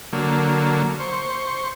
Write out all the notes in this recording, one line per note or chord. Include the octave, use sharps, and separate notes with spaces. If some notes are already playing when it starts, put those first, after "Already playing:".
D3 F#3 A#3
C5 C#6